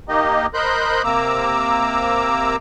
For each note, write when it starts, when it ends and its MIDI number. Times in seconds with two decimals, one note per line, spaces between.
0.09 0.46 58
0.09 0.46 63
0.09 0.46 67
0.09 0.46 75
0.54 1.02 70
0.54 1.02 72
0.54 1.02 75
0.54 1.02 83
0.54 1.02 90
0.54 1.02 91
1.04 2.56 48
1.04 2.56 58
1.04 2.56 82
1.04 2.56 86
1.04 2.56 88